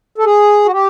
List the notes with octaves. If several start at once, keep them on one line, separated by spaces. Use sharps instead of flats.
A4
G#4
F#4
G4